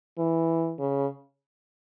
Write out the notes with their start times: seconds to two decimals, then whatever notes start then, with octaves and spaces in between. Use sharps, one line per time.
0.18 E3
0.79 C#3